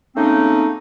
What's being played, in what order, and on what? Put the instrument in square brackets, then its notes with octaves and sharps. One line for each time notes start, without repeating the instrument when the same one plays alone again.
[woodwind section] C#3 A3 A#3 C4 C#4 D#4